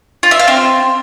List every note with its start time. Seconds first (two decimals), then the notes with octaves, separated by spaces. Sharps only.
0.23 F4
0.31 E5
0.39 F5
0.48 C4